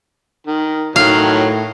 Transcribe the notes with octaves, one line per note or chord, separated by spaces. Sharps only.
D#3
A2 D#3 F#3 F5